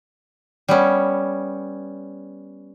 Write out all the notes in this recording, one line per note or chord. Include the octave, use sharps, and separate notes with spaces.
G3 B3 C#4